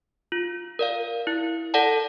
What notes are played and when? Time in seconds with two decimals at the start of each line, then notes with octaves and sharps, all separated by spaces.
0.32 F4
0.79 A#4 D5 F5
1.27 E4
1.74 A4 D5 F#5 A5